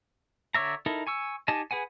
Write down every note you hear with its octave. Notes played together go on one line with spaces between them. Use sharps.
D3 C#5 D5 E5 A#5
D#4 E4 A4 A#4
G#5 C#6 E6
D#4 G4 D#5 G#5 A5
G#4 B4 F#5 G#5